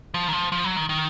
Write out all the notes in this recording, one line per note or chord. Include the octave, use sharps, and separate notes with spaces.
F3
D#3
F3
F3
F#3
D#3
D#3